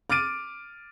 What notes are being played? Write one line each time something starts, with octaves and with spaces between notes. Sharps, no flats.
D6 F6 A6 D7 D#7